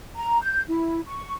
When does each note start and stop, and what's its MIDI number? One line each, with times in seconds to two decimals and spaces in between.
0.15 0.38 82
0.41 0.61 91
0.67 1.00 64
1.05 1.34 85